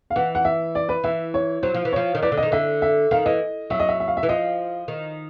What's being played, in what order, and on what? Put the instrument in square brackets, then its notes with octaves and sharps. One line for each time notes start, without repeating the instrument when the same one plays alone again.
[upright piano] F5
[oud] E3 [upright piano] F#5
[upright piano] F#5
E5
D5
B4
[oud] E3 [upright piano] E5
[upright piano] C#5
[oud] F#3 [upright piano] C5
[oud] F3
E3
[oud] F3 [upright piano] C#5
[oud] D#3
[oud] E3 [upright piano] D5
[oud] D3
[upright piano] D#5
[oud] D#3
[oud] D3 [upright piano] E5
[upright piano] E5
[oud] D#3 [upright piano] F5
[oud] E3 [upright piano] D#5
[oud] F#3 [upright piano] E5
[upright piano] D#5
E5
E5
F5
E5
[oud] E3
[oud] F3 [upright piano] D#5
[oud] D#3